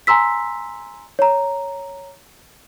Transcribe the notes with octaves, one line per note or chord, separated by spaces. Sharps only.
G#5 A#5 C6 E6 B6
C#5 A#5